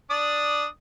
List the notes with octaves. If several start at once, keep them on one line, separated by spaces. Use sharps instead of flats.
D4 D5 D#6